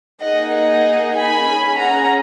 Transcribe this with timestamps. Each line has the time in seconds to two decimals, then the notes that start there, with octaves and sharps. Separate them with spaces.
0.24 A#3 D#4 G#4 D#5 F#5
0.55 D#5 F#5
1.17 G#5 B5
1.49 C#4 G#4
1.80 F#5 A#5